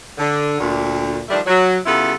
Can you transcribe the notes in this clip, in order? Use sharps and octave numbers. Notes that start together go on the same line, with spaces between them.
D3
D2 A#2
D#3 F3 G3 A3 D4
F#3
C#3 G3 B3 E4 F4 A4